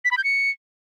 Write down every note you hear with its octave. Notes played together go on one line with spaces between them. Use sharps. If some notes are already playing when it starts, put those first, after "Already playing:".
B6
B5
G6
C#7